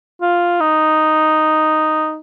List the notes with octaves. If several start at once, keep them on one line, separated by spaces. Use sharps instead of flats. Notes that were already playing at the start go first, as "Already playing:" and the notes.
F4
D#4